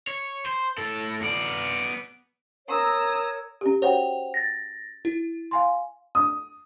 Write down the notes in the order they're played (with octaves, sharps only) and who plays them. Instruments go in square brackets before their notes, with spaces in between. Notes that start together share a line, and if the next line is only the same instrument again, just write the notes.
[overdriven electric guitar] C#5
C5
A2 A4
B3 D5
[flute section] A#4 C#5 [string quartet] A#5 D#6 E6
[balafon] C#4 G4
[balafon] F#4 C#5 [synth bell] C5 F#5 G5
[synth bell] A6 A#6
E4
[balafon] F5 G#5 C6
[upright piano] D#6